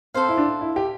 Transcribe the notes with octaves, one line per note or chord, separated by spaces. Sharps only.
C4 A4 C5 F5
E4
D4
E4
G4